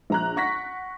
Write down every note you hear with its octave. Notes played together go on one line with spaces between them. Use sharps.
A#1 A#5 F#6
F#5 C#6 A#6 B6